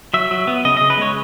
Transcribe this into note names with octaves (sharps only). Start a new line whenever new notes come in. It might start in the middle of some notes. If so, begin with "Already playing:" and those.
F#3 E5
F#3
B3
C#3 D#5
C#3 D#5
B4
G#3 C#5